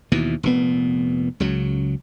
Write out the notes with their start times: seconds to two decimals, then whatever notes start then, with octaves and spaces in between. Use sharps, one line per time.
0.12 D#2 B2 E3
0.43 F1 A#2 B3
1.40 C#2 C#3 F#3